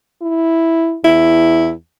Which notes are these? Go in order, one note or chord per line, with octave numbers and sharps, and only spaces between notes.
E4
E2 E4